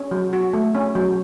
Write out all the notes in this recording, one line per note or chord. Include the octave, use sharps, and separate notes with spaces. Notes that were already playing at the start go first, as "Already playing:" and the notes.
Already playing: C#4
F#3
F#4
A3
C#4
F#3